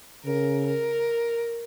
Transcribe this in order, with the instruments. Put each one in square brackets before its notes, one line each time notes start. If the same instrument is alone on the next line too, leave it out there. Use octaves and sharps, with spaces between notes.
[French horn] C#3 [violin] A#4
[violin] A#4